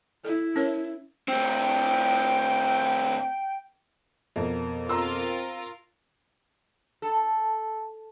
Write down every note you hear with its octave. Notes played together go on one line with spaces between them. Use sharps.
E4 A4
C#4 A#4 C#5
A2 C4 G5
F2 B2 A#3
C4 F4 A#4 A#5 C6 E6
A4